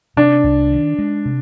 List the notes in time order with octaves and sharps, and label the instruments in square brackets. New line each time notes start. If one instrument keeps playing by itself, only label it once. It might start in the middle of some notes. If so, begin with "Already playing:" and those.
[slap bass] C3 [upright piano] D4
[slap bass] C2
D#3
G#3
C3